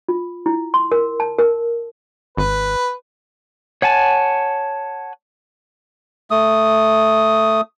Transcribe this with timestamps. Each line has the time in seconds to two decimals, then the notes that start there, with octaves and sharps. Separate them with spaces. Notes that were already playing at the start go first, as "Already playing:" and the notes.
0.09 F4
0.46 E4
0.74 C6
0.92 A#4
1.20 A5
1.39 A#4
2.37 G#1 B4
3.82 C#5 F#5 G#5 A5
6.31 A3 D#6